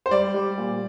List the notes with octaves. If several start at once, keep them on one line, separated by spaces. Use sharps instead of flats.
C5
G3 D5
G3
A#2